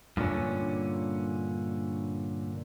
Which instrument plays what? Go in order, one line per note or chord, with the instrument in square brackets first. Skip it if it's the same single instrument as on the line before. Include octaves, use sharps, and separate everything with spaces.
[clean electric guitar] G2 A#2 D3 C#4